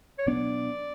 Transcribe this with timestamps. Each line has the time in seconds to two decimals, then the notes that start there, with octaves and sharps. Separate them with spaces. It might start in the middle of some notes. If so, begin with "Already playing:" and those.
0.18 C#5
0.26 B2 F#3 B3 D4 D5